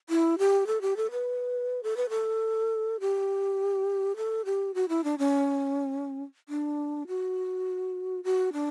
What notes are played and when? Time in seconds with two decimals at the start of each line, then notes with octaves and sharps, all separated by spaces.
0.09 E4
0.38 G4
0.67 A4
0.81 G4
0.97 A4
1.11 B4
1.83 A4
1.97 B4
2.10 A4
3.00 G4
4.17 A4
4.45 G4
4.74 F#4
4.89 E4
5.04 D4
5.18 C#4
6.49 D4
7.07 F#4
8.24 F#4
8.53 D4